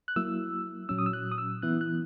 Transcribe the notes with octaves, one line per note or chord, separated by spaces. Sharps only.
F#6
F#3 A#3 E4 E6
A#2 F#3 C#4 E6
D#6
E6
F#6
D#6
E6
E3 B3 E4 F#6
F#6